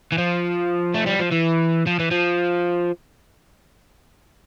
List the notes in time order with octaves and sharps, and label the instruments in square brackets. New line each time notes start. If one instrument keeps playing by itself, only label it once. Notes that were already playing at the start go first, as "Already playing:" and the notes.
[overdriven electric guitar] E3
F3
A3
G3
F3
E3
F3
E3
F3